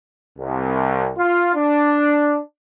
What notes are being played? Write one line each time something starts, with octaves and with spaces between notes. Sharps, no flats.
C2
F4
D4